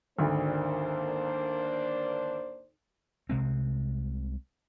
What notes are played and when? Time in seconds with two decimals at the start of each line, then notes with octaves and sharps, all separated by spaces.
0.19 G#1 D2 A#3 D4 C5
3.29 C2 C3 G#3 C4